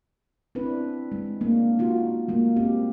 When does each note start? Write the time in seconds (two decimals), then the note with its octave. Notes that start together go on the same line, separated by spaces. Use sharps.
0.55 C4 D4 E4 B4
1.12 G#3
1.41 A#3 C4 D4
1.79 D#4 F4 F#4
2.28 G#3 A#3
2.56 C4 G4